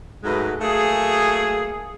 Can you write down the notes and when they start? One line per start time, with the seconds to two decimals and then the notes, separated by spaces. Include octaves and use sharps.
0.24 G#2 F#3 G#3 A3 B4
0.60 F#3 A3 A#3 G#4